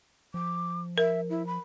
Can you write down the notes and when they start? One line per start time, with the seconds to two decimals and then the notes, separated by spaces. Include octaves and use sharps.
0.34 F3 D6
0.98 A#4 E5
1.30 E4
1.47 B5